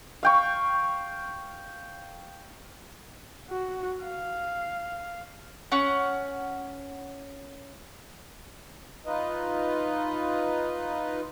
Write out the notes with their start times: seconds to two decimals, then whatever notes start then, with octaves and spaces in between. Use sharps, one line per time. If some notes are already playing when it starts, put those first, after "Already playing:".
0.23 F5 G5 C#6
3.50 F#4
4.05 F5
5.71 C#4 F#5
9.06 D#4 F4 B4 D#5